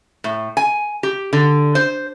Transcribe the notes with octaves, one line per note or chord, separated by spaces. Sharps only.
A2
G#5
G4
D3
C5